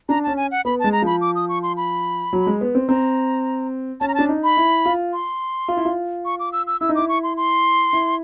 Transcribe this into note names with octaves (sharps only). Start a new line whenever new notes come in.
D4 A#5
C#4 A5
G#5
F#5
B3 B5
A5
G#3
A#5
F3 B5
D6
D#6
C#6
C6
B5
F#3
G#3
B3
C4
C4 A#5
C#4 A5
A#5
D4 A5
D#4
B5
E4
F4
C6
F4
E4
F4
C#6
D6
E6
E6
E4 E6
D#4
E4 D6
C#6
C6
C6
E4